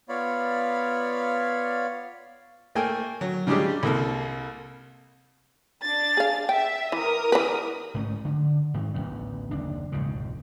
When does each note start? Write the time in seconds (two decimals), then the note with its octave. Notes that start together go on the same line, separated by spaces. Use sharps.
0.09 B3 F4 C#5 D5 F5 B5
2.75 A3 A#3 G5 G#5
3.21 F#3
3.47 C#3 G3 G#3 C#4 D4 G4
3.83 C2 A#3 A4
5.83 D4 A6
6.17 G#4 F5
6.49 E5 G5
6.92 E3 A#4 D#6
7.32 E3 B4
7.95 G#2 A3 C#4
8.25 D3
8.74 G#2 D#3
8.94 A1 D2 D3 B3
9.51 F#1 D#2 D4
9.92 E1 C#2 G#2 C#3